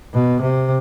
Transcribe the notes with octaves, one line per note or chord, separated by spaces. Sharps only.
B2
C3